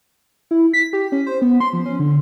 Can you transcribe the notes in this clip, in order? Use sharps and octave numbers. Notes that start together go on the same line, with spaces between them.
E4
B6
G4
C#4
C5
B3
C6
F3
C#4
D3